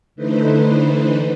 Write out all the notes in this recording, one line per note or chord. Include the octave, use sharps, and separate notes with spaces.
D3 E3 A3 D#4 B4 C5